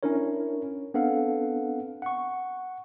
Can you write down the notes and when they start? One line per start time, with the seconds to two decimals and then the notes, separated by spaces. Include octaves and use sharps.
0.03 C#4 D4 E4 A#4 C#5
0.94 B3 C4 D4 A4 F5 F#5
2.02 F#5 C#6